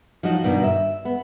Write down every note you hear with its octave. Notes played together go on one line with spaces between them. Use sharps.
F3 F#3 D#4 F#4
G2 B2 D#3
E5
B3